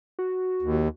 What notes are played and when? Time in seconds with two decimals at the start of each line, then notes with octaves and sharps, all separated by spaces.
0.19 F#4
0.62 D#2